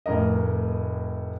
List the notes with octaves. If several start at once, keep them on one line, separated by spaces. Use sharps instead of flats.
F1 A2 A#4 D#5